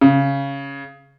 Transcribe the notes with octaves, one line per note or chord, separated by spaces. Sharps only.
C#3